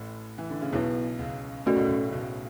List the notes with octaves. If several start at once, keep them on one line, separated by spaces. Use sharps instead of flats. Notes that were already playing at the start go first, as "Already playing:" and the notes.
Already playing: A1 A2
E3
D3
C#3
B1 B2 B3 E4 B4
C#2 C#3
B2 A3 C#4 F#4 A4 D5
A2
B1 B2
C#3
B1 B2